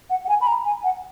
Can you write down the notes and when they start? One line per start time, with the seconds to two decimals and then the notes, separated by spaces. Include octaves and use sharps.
0.10 F#5
0.24 F#5
0.29 G#5
0.41 B5
0.47 A#5
0.65 G#5
0.84 F#5